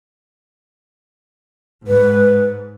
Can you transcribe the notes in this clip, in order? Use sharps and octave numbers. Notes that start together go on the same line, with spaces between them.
G#2 B4